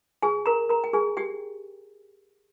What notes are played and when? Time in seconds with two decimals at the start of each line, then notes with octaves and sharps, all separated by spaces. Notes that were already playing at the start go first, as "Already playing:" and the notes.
0.23 G#4 G#5
0.46 A#4 A#5
0.69 A#4 A#5
0.84 G5
0.93 G#4 G#5
1.17 G4 G5